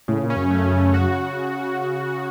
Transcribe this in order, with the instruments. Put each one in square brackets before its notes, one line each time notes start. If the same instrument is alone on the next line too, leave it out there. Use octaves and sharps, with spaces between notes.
[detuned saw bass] A2 [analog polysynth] C#3
[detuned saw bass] A#2
[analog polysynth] C#4
[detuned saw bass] F#2
[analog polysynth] A3
C#3
F#4